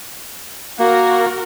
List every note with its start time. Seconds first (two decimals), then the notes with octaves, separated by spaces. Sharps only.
0.79 A#3 F#4 A#4